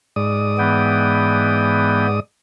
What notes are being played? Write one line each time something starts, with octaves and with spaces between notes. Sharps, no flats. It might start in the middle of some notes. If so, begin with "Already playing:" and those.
G#2 D5 D#6
E3 B3 G5